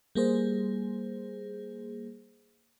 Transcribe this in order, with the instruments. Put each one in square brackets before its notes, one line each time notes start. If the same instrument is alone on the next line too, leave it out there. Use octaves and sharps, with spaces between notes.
[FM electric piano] G3 A#3 G#4 C5